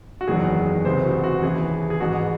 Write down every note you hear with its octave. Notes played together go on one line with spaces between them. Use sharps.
F#4
F#1 E2 D#3 F#3 G#4
C#2 C3 E3 C5
F#4
F#4
D#2 C#3 E3 G#4
G#4
A1 G#2 E3 F#4